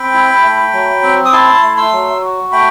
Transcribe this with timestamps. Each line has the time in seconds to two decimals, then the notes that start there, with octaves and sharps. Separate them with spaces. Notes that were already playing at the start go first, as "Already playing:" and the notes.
Already playing: C4 G5 B5
0.14 E4
0.43 A3
0.73 F#3
1.03 C4
1.25 D#6
1.32 E4 A5 C6
1.63 A3
1.77 C6 E6
1.93 F#3
2.22 F#4
2.52 A3 G5 B5